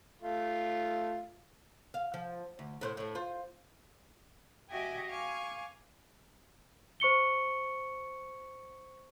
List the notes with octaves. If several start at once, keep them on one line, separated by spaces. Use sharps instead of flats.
A3 F4
F5
F3
D2
A2 B4 C5
A2 D4
F4 C5
F#4 G4 D#5 E5 G5 G#5
F5 G#5 C#6 D6
C5 C#6 C#7 G7